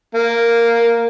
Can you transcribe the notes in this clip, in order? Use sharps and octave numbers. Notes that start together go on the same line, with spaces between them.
A#3